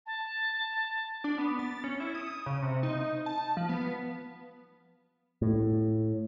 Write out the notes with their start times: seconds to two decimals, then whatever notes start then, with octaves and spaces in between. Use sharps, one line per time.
0.06 A5
1.24 D4
1.38 B3
1.59 A6
1.84 C#4
2.00 E4
2.15 D#6
2.46 C#3
2.62 C3
2.83 D#4
3.26 A5
3.57 F3
3.69 B3
5.42 A2